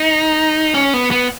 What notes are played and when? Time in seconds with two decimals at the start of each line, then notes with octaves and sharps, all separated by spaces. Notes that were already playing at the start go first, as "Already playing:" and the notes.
Already playing: D#4
0.74 C#4
0.94 B3
1.11 B3